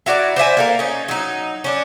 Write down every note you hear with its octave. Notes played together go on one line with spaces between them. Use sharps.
E4 F#4 D5 A#5
C5 D5 E5 G#5
A#3 A4 A#4
C#4 D#4
F#3 D#4
C#4 D4